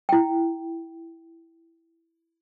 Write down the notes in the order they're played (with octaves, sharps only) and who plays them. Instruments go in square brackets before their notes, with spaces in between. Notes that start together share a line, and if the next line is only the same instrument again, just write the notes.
[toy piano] E4 G5